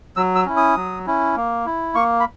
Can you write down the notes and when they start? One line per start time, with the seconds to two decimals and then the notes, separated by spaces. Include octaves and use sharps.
0.16 F#3 E6
0.36 E6
0.46 C#4 E4
0.57 D#6
0.76 F#3
1.06 C#4 E4
1.36 A#3
1.66 E4
1.95 A#3 C#6
2.20 B5